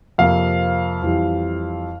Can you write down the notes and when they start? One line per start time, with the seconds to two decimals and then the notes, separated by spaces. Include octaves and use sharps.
0.18 F2 C3 F3 A#3 F5
1.02 F2 E3 G3